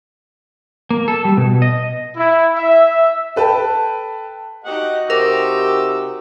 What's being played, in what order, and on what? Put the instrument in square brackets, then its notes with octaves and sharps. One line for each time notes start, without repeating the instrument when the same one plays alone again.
[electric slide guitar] A#3
A4
G3
B2
D#5
[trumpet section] E4
E5
[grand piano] A4 B4 G5 A5
[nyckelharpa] D#4 F#4 [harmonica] G4 D#5 F#5
[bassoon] C3 [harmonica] G4 D6 E6 [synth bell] A#4